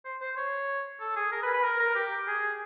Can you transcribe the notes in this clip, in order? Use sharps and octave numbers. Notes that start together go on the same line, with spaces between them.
C5
C5
C#5
A4
G#4
A#4
B4
B4
A#4
A#4
G4
G#4